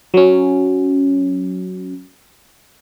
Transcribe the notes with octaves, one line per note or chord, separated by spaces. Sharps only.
F#3 C#4